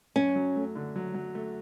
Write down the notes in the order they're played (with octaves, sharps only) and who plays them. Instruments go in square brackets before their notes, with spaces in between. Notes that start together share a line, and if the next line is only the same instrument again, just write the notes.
[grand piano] F#2 [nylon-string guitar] C#4
[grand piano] F#3
A3
D3
F#3
F#3
A3